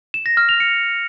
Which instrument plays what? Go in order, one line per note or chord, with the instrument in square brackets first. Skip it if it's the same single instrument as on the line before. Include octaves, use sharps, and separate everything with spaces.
[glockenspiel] E7
A#6
F6
F7
C#7